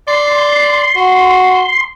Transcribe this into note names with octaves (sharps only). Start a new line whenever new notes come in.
D5 C6
F#4